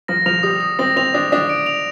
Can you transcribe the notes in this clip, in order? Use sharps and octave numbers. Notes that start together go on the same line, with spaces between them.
F3 A#6
F3 F7
G3 D#6
D#6
C4 A#6
C4 F7
D4 D#6
D4 D#6
D7
F7